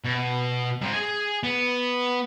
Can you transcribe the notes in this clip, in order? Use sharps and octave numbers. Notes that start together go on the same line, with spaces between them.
B2
G#2 C4
G#4 G#5
B3